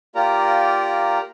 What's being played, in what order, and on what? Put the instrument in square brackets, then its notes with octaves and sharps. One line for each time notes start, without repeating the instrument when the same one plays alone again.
[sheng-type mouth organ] A#3 F4 G4 A#4 D5 A#5